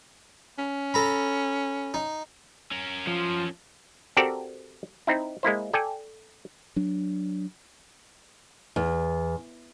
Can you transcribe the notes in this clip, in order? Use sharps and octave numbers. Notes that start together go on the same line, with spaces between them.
C#4
A4 A#5 B5
D#4
C#4 A#4
F3
C4 F#4 G4 A4 A#4 D5
C4 D#4 E4
G#3 A#3 E4 C5
A4 D5 G5 G#5
F#3 D4
E2